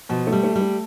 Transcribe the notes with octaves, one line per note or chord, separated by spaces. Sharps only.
B2 F3
A3
G3
A3
G3
A3